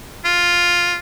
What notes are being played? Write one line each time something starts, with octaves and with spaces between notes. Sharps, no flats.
F4